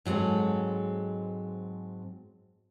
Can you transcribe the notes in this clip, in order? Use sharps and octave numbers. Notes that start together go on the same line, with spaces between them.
G#2 F#3 G#3 C4 A4